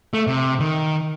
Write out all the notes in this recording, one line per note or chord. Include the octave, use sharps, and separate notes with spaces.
A3
C3
D#3